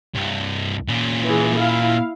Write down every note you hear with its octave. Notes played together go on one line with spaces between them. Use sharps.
C2 G2
A#2 C#4
E3 G#4
E4 F5